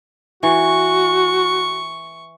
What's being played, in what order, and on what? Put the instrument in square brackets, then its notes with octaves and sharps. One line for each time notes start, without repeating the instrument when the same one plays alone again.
[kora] E3 [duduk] F#4 [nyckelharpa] C#6